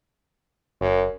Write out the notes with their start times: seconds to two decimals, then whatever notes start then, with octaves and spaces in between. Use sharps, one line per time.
0.81 F#1 F#2